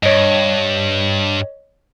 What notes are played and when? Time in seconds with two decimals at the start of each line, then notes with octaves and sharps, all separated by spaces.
0.03 G2 C#5 D#5